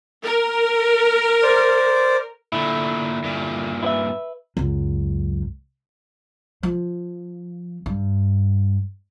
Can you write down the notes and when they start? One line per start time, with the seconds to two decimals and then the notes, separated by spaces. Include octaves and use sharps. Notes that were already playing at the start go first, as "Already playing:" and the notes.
0.25 A#4
1.43 C5 D5
2.52 A#2 D3 A3 E4
3.24 G2 A#2
3.83 E4 B4 E5
4.57 C#2 F#2
6.63 F3
7.86 G2